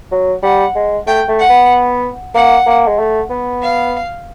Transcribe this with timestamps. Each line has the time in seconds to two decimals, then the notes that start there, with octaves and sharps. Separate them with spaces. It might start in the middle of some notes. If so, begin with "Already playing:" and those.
0.11 F#3
0.43 G3 F#5
0.76 G#3
1.07 A3 G5
1.28 A3
1.39 F#5
1.50 B3
2.34 A#3 F#5
2.66 A#3
2.88 G#3
2.99 A3
3.30 B3
3.62 F5